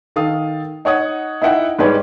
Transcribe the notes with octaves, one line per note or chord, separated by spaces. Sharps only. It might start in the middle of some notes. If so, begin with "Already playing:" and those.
D#3 A4 F5 D#6
D#4 C#5 F#5 D#6
D#4 E4 E5 F#5 G5
G#2 G3 G#3 B4 C#5 G5